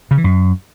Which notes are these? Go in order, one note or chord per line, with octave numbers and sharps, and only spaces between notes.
C#3
E3
F#2